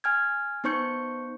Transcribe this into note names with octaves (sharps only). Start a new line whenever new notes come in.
G#5 F6 G#6
B3 D#4 C5 C#6 G6 C#7